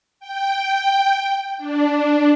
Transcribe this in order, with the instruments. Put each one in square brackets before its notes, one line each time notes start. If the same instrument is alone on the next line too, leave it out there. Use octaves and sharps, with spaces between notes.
[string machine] G5
D4